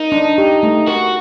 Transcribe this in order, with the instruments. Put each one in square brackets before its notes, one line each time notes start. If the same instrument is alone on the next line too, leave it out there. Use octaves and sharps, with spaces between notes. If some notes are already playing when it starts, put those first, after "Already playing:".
Already playing: [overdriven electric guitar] D#4 [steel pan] A#4
[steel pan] D4
G4
A3
[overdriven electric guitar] F#4 [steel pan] A#4